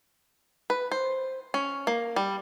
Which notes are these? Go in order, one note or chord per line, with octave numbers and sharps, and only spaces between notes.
B4
C5
C#4
A#3
G3